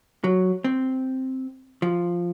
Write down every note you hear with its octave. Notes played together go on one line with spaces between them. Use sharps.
F#3
C4
F3